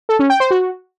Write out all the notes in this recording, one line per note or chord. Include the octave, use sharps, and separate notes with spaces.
A4
C#4
G5
C5
F#4